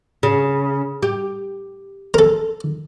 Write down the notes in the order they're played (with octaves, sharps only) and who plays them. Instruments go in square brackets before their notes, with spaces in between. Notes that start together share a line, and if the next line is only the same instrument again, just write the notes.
[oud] C#3
G4
[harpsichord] A4 A#4